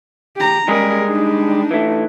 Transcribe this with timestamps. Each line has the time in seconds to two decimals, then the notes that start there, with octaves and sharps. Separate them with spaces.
0.36 G4 A#5
0.68 G3 G#3 C#4 G#4 A#4
1.08 D4 D#4
1.71 E3 A3